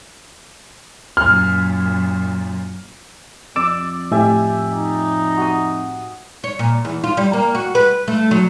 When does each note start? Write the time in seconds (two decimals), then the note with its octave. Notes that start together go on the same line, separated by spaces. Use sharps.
1.17 F#2 A#2 F6
3.56 F2 D5 D6 E6
4.11 A2 G4 E5 G#5
4.71 D#4
5.37 F#4 D#6
6.44 C#5
6.59 A#2
6.85 E2
7.04 F4
7.17 G3
7.33 A#3
7.55 F#4
7.75 B4
8.08 A3
8.31 F#3